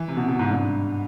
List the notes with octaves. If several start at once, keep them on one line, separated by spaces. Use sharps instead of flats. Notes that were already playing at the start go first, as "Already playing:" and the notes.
Already playing: E3
C3
B2
B2
G#2
G2